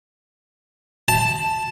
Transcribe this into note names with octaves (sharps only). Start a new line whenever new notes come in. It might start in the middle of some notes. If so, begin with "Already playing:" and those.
A5